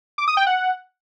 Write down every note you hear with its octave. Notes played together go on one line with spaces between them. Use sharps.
D6
D#6
G5
F#5